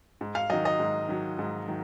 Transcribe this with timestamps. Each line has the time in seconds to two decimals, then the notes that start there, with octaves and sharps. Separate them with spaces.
0.21 G#2
0.35 F5
0.50 D#3 F#3 D#5
0.65 D#5
0.80 G#2
1.08 D#3 F#3
1.39 G#2
1.68 D#3 F#3